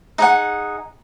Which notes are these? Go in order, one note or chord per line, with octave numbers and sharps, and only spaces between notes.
D#4 G#4 F#5